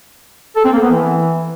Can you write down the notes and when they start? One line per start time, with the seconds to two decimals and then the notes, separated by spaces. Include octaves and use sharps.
0.56 A4
0.65 C4
0.73 A#3
0.82 B3
0.90 E3